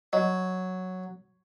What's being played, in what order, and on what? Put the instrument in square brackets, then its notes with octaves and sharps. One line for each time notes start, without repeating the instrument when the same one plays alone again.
[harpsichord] F#3 [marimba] D#5